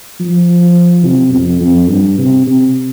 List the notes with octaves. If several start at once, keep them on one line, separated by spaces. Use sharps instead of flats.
F3
C3
F2
F2
G2
C3
C3